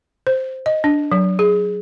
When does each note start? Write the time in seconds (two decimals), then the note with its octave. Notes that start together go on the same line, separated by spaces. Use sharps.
0.27 C5
0.66 D#5
0.84 D4
1.12 F#3
1.39 G#4